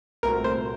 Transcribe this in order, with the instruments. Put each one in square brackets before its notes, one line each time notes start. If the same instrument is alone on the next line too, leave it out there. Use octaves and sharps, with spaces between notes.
[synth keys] C2 A#2 A3 C4 F#4 [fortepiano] A#4
[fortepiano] C5